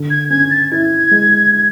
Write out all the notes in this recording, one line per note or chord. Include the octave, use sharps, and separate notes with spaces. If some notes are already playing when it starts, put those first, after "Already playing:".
Already playing: D3
G#6
C#4 G#6
A6
E4 G#6
G#3